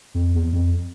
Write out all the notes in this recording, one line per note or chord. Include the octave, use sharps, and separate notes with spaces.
F2
E2
F2